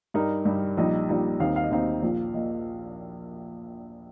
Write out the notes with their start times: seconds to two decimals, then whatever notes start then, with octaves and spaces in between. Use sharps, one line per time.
0.14 G2 G3 D#4 A#4
0.45 G2 G3 D#4
0.77 A#1 A#2 G3 D#4 D#5
1.09 A#1 A#2 G3 D#4
1.40 D#2 D#3 C4 D#4 F5
1.56 F5
1.64 D#5
1.71 D#2 D#3 C4 D#4 F5
2.03 A#1 A#2 F3
2.34 A#2 F3 D#5